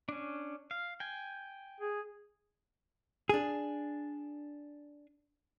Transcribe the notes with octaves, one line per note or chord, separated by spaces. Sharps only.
C#4 D4
F5
G5 G#5
G#4
D4 G#4